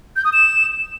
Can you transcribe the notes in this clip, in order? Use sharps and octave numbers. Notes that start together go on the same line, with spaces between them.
G6
D#6
E7